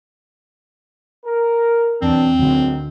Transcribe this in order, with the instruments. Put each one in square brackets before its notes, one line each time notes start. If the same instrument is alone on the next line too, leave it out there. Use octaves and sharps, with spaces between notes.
[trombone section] A#4
[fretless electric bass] E2 [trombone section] B2 F#3 D4 [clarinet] C4
[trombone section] G#1 D#3 F#3 [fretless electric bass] D2 D3